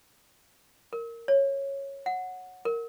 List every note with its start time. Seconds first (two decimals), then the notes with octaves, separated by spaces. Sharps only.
0.93 A#4
1.28 C#5
2.06 F#5
2.65 A#4